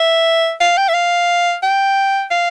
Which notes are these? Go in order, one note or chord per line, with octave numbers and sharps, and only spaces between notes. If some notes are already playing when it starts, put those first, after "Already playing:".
Already playing: E5
F5
G5
E5
F5
G5
F5